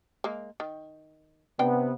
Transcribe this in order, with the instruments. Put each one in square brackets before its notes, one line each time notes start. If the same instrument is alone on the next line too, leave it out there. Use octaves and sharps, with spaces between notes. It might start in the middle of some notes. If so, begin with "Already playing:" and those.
[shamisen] G#3 A#3
D#3
[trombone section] C3 B3 [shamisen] D4 G5